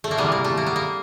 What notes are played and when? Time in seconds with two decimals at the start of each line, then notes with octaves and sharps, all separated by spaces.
0.04 A3
0.11 A#3
0.18 C3 E3 G3 B3
0.32 A#3
0.44 A3
0.57 A#3
0.66 B3
0.76 A#3